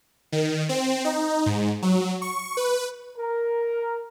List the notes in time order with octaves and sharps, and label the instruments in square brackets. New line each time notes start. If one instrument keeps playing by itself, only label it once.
[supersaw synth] D#3
C4
D#4
G#2
F#3
C#6
B4
[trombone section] A#4